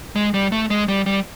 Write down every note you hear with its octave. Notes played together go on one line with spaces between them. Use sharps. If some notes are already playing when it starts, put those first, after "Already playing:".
G#3
G3
A3
G#3
G3
G3